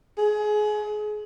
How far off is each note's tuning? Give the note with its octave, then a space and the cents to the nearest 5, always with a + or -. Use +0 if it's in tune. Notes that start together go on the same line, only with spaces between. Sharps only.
G#4 +25